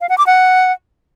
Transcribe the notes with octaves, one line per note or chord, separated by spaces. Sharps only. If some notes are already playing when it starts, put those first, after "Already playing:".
F5
F#5
D6
F#5